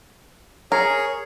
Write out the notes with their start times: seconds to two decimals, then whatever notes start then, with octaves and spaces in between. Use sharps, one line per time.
0.72 G#4 A#4 C#5